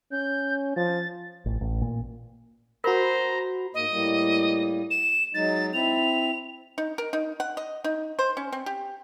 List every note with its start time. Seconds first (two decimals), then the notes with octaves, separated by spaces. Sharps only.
0.12 C#4 G6
0.76 F3 A6
1.46 A1
1.61 A1
1.81 A#2
2.84 F#4 A#4 C5 A#5 B5
3.74 G#2 A#3 D#5
3.91 A2 G3 A#3
4.91 E7
5.34 F#3 G#3 D#4 A6
5.74 C4 E4 F7
6.78 D#4
6.98 A#4
7.13 D#4
7.40 F#5
7.57 D#5
7.84 D#4
8.19 C5
8.37 C#4
8.52 C4
8.66 G4